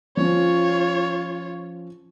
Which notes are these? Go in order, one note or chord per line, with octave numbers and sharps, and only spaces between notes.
F3 C#4 F4 C#5